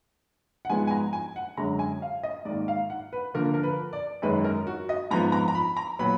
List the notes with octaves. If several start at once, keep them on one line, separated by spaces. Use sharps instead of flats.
F#5
G#2 F3 G#3 B3 G#5
G#5
A#5
G#5
F#5
F#2 D3 G#3 A#5
G#5
F5
D#5
G#2 D#3 A#3 D5
F5
F#5
B4
D3 F3 A#3 A#4
A#4
B4
D5
F#2 D#3 G#3 B4
A#4
F#4
D#5
G#2 F3 B3 A#5
A#5
A#5
B5
A#5
A#2 F#3 B3 B5